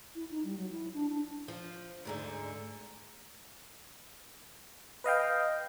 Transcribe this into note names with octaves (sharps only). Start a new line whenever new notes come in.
E4
D#4
G3
F#3
E4
D4
D4
F3
D2 G#2 D3
B4 D#5 F5 G5